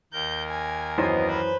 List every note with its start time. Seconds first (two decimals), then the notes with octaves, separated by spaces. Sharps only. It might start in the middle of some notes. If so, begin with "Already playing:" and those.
0.13 D#2 A#4 G6
0.49 G#5
0.98 F#2 E3 B3 C5 C#5 D#5
1.29 B4 C5